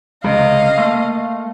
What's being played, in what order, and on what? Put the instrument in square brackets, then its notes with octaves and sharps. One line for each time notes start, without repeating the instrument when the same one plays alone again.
[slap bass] C#2 C3 [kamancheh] D#5 F5
[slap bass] A3 [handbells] A#3